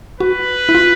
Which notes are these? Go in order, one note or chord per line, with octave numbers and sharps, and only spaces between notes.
F#4 B4
E4
F4